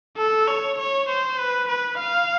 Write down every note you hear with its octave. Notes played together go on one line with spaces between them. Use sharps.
A4
C#5
C#5
C5
B4
B4
F5